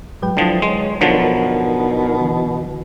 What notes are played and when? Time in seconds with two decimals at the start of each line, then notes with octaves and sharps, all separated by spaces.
0.22 G#2 F#3 G#3 F#4 B4 G5
0.37 D3 F3 F#3 E4 D#6
0.62 G#3 C#5 C6
1.01 B2 D3 F3 F#3 D#4 A#4
2.21 D3 E3